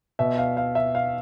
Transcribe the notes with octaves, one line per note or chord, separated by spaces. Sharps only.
B2 E5
F5
F5
E5
F5